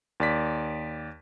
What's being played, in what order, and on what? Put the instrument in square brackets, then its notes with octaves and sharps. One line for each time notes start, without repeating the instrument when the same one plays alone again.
[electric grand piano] D#2 D5 B6